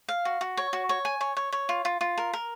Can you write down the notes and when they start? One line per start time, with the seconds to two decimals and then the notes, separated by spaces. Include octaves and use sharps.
0.09 F5
0.25 F#4
0.41 F#4
0.57 C#5
0.73 F#4
0.89 C#5
1.05 G#5
1.21 C#5
1.37 C#5
1.52 C#5
1.69 F4
1.85 F4
2.01 F4
2.18 A#4
2.33 A#4